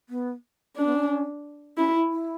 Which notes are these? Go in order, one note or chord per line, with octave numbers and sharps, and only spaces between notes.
B3
C#4 D4
B3
C#4
C#4 E4
E4
E4